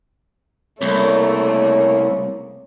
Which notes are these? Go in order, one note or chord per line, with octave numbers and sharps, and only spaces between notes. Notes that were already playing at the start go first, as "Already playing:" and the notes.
C2 C#3 A3 A#3 A#4 C#5